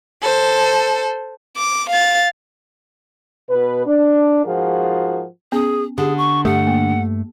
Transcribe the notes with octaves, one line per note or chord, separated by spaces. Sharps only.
A4 C5
D6
F5 A6
B2 B4
D4
G#2 F3 F4 F#4 G#4 A#4
B3 C#4 G#4
D3 G4 G#4
C#6
G2 A3 G4 F#5
A#3